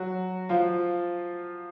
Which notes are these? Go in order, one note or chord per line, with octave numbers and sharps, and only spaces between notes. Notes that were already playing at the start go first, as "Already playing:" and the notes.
Already playing: F#3 F#4
F3 F4